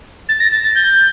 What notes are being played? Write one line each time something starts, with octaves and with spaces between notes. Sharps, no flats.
A6
A#6
A6
A6
G6